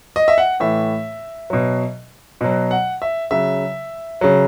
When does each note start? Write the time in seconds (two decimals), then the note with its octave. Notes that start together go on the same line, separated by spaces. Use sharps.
0.16 D#5
0.28 E5
0.38 F#5
0.60 A2 E3 E5
1.50 B2 F#3
2.41 B2 F#3
2.71 F#5
3.02 E5
3.31 C#3 F#3 E5
4.21 C#3 F#3